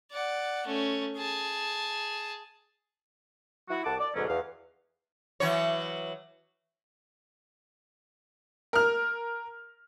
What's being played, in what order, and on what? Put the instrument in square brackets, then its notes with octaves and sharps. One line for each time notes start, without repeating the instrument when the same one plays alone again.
[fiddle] D5 F#5
A3 C#4
G#4 A5
[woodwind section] E4 F#4
C2 F#5 A5 D6
D5
D2 G#2 B2 D3 F#3 C#4
E2 F5
[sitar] E3 F#3 C#5
[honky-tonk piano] A#4 F6